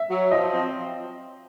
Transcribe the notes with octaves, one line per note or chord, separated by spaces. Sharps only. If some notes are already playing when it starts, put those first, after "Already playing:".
Already playing: E5
F#3
F3 D#5
C4